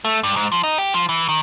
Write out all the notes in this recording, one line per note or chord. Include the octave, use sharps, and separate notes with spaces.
A3
G2
G#2
F3
D#4
G4
F3
E3
D#3